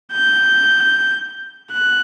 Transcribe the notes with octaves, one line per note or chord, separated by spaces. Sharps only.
G6
F#6